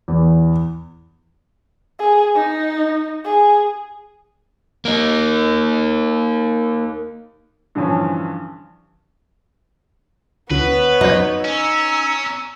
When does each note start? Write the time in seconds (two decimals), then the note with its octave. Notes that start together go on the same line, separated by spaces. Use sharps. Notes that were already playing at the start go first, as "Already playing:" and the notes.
0.08 E2
1.99 G#4
2.35 D#4
3.25 G#4
4.85 A#3 D#4
7.75 G2 D3 E3 F3 C#4
10.51 D2 B3 B4 C#5
11.01 F#2 D#4 C5
11.45 C#4 A#5 E6